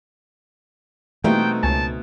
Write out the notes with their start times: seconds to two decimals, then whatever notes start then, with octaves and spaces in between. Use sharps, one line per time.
1.24 B2 E3 G3 A3 A#3 C4 D#4 G5
1.63 C#2 C#5 G#5 A5